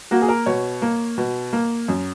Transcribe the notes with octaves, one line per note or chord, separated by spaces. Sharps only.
A#3 F#4
G#4
A#4
B2 C#5
A#3
B2
A#3
F#2